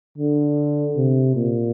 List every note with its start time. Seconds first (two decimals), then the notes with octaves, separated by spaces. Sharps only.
0.18 D3
0.96 C3
1.35 A#2